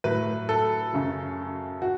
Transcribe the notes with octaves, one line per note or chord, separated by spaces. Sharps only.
A2 F#3 B4
A4
F#2 C#3 F#3
F#4